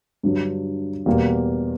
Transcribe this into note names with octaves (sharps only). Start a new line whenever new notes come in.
G2 D3 F#3
E2 B2 G3 A#3